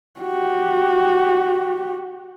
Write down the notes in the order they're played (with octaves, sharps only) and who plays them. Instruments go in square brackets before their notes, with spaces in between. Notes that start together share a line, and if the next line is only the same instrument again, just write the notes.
[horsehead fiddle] F#4 G4